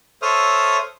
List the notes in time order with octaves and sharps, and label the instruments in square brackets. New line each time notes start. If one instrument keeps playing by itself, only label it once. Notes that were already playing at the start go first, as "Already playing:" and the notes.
[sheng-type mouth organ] A4 C5 C#5 E5 D#6 F6